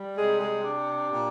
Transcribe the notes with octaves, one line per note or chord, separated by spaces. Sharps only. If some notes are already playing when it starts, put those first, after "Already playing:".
Already playing: G3
C3 G#3 G#4
G#3 G#4
D4
A#2 G4